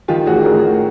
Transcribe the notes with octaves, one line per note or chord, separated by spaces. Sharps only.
D#3 F4 G4
A1 F#4 G#4
A1 G#4 A#4
A1